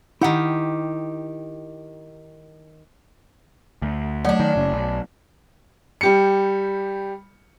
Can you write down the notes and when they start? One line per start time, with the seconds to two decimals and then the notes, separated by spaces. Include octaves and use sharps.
0.21 D#3 E4 G4 F#5
3.82 D2
4.25 F#3 A3 C#4 D4 D5
4.40 D#3
4.56 F#1 C#3
4.73 B1
6.01 G3 G4 C#7